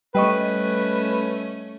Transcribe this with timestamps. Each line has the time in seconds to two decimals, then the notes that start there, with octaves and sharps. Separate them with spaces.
0.15 G3 A3 C#4 B4 D#5 C#6